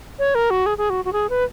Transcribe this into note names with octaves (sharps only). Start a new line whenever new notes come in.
C#5
A#4
F#4
G#4
G#4
F#4
F#4
G#4
B4